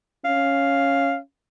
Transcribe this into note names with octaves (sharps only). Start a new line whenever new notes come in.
C#4 F5